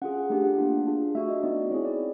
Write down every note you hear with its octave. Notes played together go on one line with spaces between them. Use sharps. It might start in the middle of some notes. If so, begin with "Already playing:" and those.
C#4 F4 G#4 F#5
A3 D4 G4
F#5
A#3 D4 F4
D4 F4 G#4
A3 D4 F#4 E5
D#5
B3 D#4 F#4 D5
C4 E4 G#4 C#5
D5